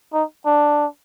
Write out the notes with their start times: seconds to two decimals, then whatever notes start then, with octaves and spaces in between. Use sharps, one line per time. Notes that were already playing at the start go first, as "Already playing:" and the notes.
0.13 D#4
0.46 D4